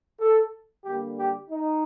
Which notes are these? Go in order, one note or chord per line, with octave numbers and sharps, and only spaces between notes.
A4
D3 G3 A#3 G4
G4
D#4